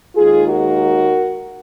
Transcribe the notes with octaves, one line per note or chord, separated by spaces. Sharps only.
D#2 D#3 G#3 F4 G#4
F#4 A#4